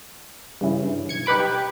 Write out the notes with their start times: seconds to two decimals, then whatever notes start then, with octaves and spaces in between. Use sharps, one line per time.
0.61 G2 C#3 E3
0.85 G2
1.09 B1 G#6 C#7
1.26 D#4 G4 B4 B5 D6
1.40 G4